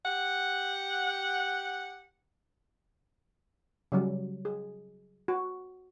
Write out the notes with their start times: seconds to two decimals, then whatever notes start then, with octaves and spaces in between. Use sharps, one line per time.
0.06 G4 F#5
3.92 C#3 F#3 G3
4.45 G#4
5.28 F#4